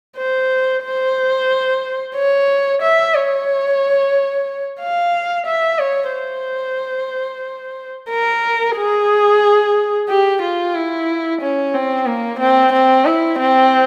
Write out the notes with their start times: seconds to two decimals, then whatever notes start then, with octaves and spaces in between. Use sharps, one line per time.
0.17 C5
0.84 C5
2.16 C#5
2.82 E5
3.14 C#5
4.80 F5
5.46 E5
5.79 C#5
6.12 C5
8.10 A#4
8.77 G#4
10.08 G4
10.42 F4
10.75 E4
11.41 C#4
11.74 C4
12.06 A#3
12.40 C4
12.73 C4
13.05 E4
13.39 C4